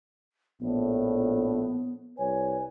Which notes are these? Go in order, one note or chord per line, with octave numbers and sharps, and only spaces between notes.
A#1 A2 B3
C2 B4 C#5 G#5